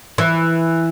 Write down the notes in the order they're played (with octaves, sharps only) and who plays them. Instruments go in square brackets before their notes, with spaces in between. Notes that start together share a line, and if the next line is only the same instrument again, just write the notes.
[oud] E3